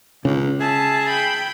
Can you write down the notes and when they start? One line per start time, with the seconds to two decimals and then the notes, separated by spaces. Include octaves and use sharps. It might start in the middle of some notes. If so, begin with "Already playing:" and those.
0.25 C#2 C#3
0.60 G#4 E5 A5
1.10 G5 B5